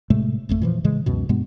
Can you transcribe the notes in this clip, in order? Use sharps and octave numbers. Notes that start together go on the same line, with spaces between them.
A2 C3 G#3 A3
G#1 F2 A3
A#2 E3 F3
A2 C#3 E3 G#3
C#2 F#2 B2
G2 B2 G#3 B3